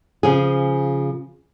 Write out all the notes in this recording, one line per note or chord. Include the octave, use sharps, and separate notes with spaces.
C#3 F3 G#4